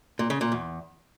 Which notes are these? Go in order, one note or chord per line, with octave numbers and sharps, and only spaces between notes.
A#2
C#3
A#2
E2